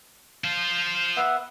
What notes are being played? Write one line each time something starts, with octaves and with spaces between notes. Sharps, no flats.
F4 C5
B3 E5 F#5